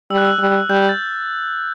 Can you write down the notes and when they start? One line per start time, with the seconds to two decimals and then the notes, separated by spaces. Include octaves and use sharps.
0.10 G3 E6
0.18 F#6
0.25 E6
0.39 G3 F#6
0.70 G3 G6
0.89 A6